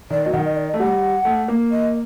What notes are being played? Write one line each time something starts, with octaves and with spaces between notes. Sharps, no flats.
D#3 D5
F#3 D#5
D#3 F#5
D#5
D5
D#5
A3
G3 F#5
A3
A#3
D#5